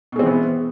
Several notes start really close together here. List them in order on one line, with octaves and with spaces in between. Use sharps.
B2 G#3 C4 E3 B3